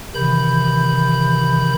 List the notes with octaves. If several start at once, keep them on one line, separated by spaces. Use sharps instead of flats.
C3 D#3 E3 B5 G6